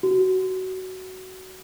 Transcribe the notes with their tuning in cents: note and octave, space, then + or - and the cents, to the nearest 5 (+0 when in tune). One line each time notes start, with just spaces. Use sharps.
F#4 +15